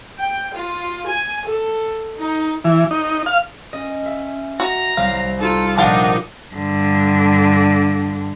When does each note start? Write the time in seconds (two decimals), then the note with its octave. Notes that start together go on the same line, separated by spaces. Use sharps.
0.17 G5
0.54 F4
1.07 G#5
1.45 A4
2.17 D#4
2.64 E3
2.91 D#4
3.26 F5
3.73 C#4 D#5
4.06 E5
4.60 F#4 A#5
4.97 C2 F#3 F5
5.40 D#4 F4 A4
5.78 A#1 C3 D4 D#4 A4 F5 F#5 A5
6.55 G2 D3